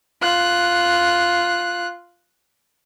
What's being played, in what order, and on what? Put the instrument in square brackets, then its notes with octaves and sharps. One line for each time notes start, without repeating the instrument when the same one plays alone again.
[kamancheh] F4 F#6